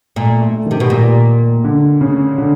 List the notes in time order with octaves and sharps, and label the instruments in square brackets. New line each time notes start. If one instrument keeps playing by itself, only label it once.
[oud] A#2 [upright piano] A3
[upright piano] A3
[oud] C3 [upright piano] D#3
[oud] B2
A#2
[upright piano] D3
C#3
D3